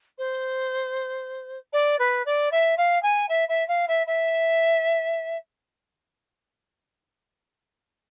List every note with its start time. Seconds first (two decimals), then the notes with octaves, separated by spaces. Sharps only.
0.18 C5
1.72 D5
1.99 B4
2.25 D5
2.51 E5
2.77 F5
3.02 G#5
3.29 E5
3.48 E5
3.68 F5
3.88 E5
4.06 E5